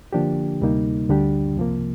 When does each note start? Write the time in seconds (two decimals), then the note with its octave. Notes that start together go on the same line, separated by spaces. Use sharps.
0.13 D3 F3 A#3 D4 G4
0.61 D2 C3 G3 A#3 D#4
1.09 D2 D3 G3 D4 G4
1.57 C2 C3 F3 A#3